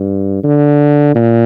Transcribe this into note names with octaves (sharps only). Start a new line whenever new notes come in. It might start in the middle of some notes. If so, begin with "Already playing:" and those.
Already playing: G2
D3
A#2